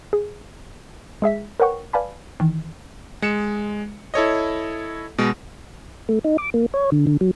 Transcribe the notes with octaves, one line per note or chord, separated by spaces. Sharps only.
G#4
G#3 G#4 E5 B6
A#4 B4 C#5 F#5 G5 C#6
B4 D5 F5 G#5 A5 B5
D#3 E3
G#3 C#7 E7
E4 A4 C#5 D#5
B2 G#3
A3
D#4
D6
A#3
C#5
D3
D3
F#3